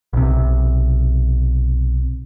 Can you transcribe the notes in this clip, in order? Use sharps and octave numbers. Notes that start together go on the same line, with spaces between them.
B1 C3